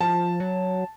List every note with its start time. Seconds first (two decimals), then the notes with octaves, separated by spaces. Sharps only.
0.01 F3 A5
0.40 F#3